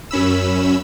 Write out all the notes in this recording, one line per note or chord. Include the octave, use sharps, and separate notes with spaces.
F#2 C#4 B5 E6